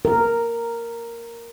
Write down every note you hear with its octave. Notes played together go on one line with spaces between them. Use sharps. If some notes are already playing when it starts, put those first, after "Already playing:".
A#4